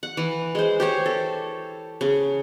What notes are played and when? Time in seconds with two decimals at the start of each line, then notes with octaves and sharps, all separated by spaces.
0.03 F#5
0.17 E3
0.55 G#3 C5
0.80 G4 C5 C#5
1.06 A4
2.01 C#3